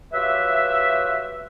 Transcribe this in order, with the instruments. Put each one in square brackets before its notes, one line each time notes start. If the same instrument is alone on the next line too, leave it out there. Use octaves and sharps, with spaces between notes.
[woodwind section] F#3 F4 G4 B4 E5